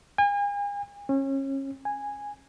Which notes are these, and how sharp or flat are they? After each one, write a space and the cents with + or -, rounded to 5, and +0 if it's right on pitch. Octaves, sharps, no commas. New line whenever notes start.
G#5 -40
C#4 -30
G#5 -10